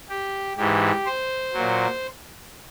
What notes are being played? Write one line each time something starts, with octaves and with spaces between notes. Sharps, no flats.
G4
G#2 E3 G4
C5
A#2 F#3